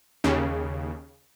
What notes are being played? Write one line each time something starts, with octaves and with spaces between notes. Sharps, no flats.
D#2 C#3